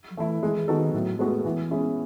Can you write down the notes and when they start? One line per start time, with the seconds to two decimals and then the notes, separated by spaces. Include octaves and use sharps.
0.10 F#3
0.17 E3 A3 E4
0.43 E3 G#3
0.56 E3
0.67 D#3 B3 D#4 F#4 A4
0.93 A2 F#3
1.19 G#3 A3 B3 F#4
1.44 E3 B3
1.70 G#3 C#4 E4 G#4